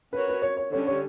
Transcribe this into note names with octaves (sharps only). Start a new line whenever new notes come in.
C#4 F#4 A#4 B4 C#5
B4
C#5
C#5
D3 G3 C#4 C#5
C#5